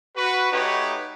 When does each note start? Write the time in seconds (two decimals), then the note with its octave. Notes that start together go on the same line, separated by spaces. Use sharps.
0.16 F#4 B4
0.51 A3 D#4 F#4 G4 B4 C#5